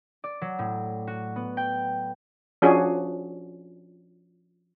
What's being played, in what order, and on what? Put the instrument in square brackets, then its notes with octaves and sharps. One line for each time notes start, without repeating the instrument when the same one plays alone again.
[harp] D5
F#3
A2
F#4
B3
G5
[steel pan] F3 C#4 D4 F#4 G#4